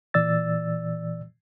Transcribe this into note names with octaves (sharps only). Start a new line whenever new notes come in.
A#2 E3 D5 E6 A6